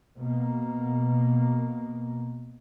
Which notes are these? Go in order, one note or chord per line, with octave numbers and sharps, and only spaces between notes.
B2 A#3